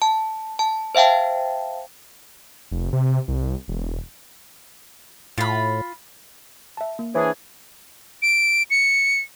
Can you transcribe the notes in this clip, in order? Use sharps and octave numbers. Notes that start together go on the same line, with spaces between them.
A5
A5
C5 E5 F5 G5 A5
F1
C3
C2
E1
A2 F4 B5
E5 A5
A#3
E3 D4 G#4 C5 C#5
D7
C#7